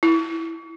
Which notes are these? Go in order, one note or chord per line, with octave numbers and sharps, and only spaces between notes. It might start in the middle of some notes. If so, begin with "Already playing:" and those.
E4